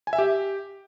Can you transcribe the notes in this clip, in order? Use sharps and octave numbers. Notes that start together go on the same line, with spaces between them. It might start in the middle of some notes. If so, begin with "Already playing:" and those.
G#5
E5
G4